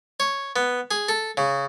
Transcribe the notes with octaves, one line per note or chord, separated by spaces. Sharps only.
C#5
B3
G#4
A4
C#3